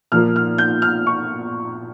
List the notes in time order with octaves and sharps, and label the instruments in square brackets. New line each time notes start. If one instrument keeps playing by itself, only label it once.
[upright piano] A#2 F3 A#3 F6
F6
G6
F6
C#6